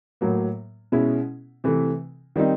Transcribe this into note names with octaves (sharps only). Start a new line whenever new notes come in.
A2 F#3 A#3
B2 G#3 C#4 E4
C3 E3 A3
D#3 G3 C4 D#4